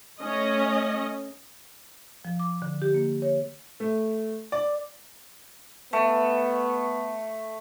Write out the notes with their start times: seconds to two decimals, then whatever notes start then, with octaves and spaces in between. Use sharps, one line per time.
0.21 A3 C#4 D#5
2.25 F3
2.40 D6
2.62 D3
2.82 G4
2.94 A#3
3.22 C#5
3.80 A3
4.52 D5
5.93 A3 B3